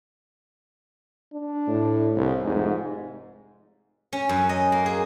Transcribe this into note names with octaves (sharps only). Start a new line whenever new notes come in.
D4
A2
C2
F1 G#2
C#4
F#2
D#5
A#3
G#4